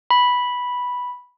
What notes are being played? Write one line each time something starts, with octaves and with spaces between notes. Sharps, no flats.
B5